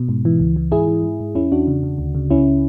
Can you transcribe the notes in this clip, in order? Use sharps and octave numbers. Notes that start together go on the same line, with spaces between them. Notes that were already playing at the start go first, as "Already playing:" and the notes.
Already playing: B2
G#2
E3
C#2
E3
G#2 E4 G#4
E3
G#2
G#2
E2 C#4 E4
E2 D4 F#4
C#3
C#3
D2
C#3
C#2 C#4 E4